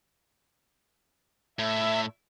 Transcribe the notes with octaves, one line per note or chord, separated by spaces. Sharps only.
A2 E5